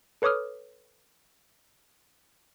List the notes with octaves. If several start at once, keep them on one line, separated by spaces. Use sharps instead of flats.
A4 B4 C#5 D6 D#6 F6